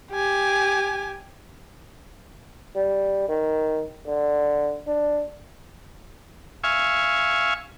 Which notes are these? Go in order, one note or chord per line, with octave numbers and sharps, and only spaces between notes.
G4 G#5
G3
D#3
D3
D4
E5 F5 G#5 C#6